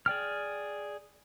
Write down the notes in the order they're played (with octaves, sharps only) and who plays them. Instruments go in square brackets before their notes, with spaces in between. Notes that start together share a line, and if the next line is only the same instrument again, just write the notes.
[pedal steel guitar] G#4 D5 G5 F6